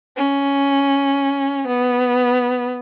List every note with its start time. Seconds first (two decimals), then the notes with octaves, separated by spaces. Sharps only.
0.16 C#4
1.67 B3